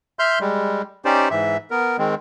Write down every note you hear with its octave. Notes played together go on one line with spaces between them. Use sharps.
E5 C6 F6 G6
G3 G#3
C#4 D#4 G4 C5 D5
G#2 E3 E5
B3 A#4
D#3 G#3 C4